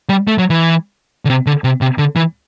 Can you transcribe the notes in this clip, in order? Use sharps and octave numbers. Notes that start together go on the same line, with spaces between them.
G3
A3
F#3
E3
D3
C3
D3
C3
C3
D3
E3